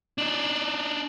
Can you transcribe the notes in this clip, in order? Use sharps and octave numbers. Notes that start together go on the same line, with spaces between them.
D4 D#4